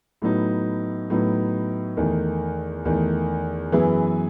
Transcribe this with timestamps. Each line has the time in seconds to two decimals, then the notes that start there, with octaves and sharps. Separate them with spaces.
0.22 A2 F#3 B3 D#4
1.10 A2 F#3 B3 D#4
1.97 E2 D#3 A3
2.85 E2 D#3 A3
3.72 F#2 E3 B3 E4 G#4